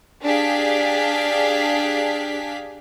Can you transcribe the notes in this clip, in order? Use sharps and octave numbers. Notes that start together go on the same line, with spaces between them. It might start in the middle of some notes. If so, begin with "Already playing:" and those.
D4 G4 G#4 F5 B6